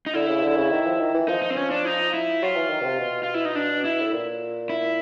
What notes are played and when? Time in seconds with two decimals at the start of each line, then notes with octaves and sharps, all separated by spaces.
0.06 D#4
0.14 D3 E4
0.28 C#3
0.42 D3
0.56 C#3
0.71 D#3
0.86 F3
0.99 D#3
1.14 E3
1.28 F3 D#4
1.42 D#4
1.50 C4
1.57 C#4
1.71 D4
1.85 D#4
2.14 E4
2.42 F#3 F4
2.56 E3
2.70 D#3
2.81 B2
2.84 C3
2.98 B2
3.23 F4
3.34 E4
3.45 D#4
3.55 D4
3.85 E4
4.01 A2
4.13 A#2
4.70 E4